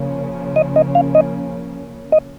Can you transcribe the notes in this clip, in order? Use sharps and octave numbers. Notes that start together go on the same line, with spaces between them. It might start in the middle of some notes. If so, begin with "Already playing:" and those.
Already playing: C#3 F3 A#3 C#4
D#5
D#5
F5
D#5
D#5